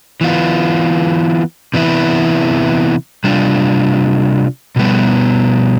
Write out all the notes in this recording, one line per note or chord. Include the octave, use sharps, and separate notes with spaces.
E3 B3 F4
C3 E3 B3 E4
C3 G3 D4 F4
B2 G3 B3